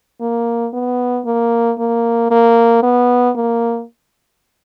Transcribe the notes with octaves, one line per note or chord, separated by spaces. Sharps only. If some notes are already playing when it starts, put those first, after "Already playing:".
A#3
B3
A#3
A#3
A#3
B3
A#3